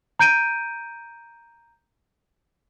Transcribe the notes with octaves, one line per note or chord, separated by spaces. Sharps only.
A#5 G6 D7 D#7